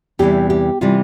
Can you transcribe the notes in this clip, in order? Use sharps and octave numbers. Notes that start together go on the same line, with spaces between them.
E2 C3 E3 G3 G4
G4
C3 E3 G3 F4